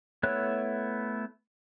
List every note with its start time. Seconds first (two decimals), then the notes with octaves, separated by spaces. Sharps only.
0.23 A3 B3 E4 C#5 F#6